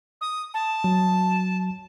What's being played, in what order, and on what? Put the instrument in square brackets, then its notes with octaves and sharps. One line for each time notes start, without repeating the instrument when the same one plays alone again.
[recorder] D#6
A5
[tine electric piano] F#3